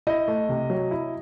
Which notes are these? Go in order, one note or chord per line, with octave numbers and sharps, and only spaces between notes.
E4 D#5
A3
C3
F#3
E4